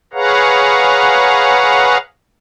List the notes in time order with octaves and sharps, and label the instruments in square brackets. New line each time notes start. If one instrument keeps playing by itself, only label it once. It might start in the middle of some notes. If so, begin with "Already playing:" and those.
[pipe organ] G#4 B4 C#5 F5 F#5 A#5